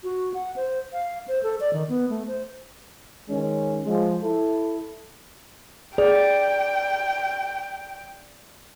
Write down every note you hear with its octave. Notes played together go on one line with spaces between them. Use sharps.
F#4
F#5
C5
F5
C5
A4
D5
D#3
B3
A3
C5
D#3 G#3 C#4
F3 G#3
E4 A4
G#4 D5 G5